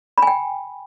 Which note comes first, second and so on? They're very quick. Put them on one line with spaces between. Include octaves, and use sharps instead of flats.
B5 G#5 G5